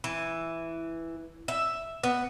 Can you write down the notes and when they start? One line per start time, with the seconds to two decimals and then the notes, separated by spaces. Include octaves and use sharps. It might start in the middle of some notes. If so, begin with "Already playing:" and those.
0.04 E3
1.48 E5
2.04 B3